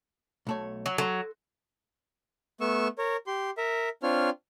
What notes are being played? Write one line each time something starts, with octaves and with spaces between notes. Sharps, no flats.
B1 A3 C#5
F#3
F#3 A4 C6
A3 B3 C#6 E6
A#4 C#5
G4 C6
A#4 E5
C4 D4 F4 C#5 F6